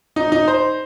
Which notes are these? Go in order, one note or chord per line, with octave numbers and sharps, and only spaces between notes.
D#4
D#4
C5